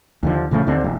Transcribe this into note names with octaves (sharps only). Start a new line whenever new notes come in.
D#2 D3 F3
A#1 C#3 F3 A3
D#2 D3 C4 D4
E1